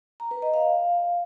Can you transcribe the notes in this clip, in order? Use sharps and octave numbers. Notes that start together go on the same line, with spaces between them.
A#5
B4
D#5
F5